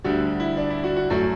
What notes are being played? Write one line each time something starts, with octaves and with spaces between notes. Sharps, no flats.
D2 D3 G3 F#4
E4
D4
E4
F#4
F#4
F#2 F#3 A3 F#4